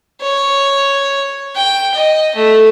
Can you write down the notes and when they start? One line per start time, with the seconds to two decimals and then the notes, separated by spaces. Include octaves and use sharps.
0.22 C#5
1.55 G5
1.94 D#5
2.35 A3